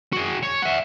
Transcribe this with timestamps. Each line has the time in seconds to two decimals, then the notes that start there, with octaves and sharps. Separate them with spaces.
0.13 F#4 G#4
0.43 C#5
0.62 E5 F#5